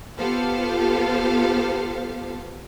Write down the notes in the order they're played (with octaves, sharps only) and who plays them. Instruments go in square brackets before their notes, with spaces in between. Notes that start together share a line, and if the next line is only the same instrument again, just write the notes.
[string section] B3 F4 G4 A4 C5 F5